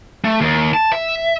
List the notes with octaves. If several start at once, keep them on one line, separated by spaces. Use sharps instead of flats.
A3
D#2
A5
E5